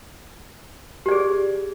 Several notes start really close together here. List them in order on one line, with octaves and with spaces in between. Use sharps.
G4 D5 G#4